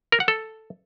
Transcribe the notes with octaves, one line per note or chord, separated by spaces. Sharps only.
A#4
F#5
A4